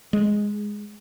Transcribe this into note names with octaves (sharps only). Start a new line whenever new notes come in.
G#3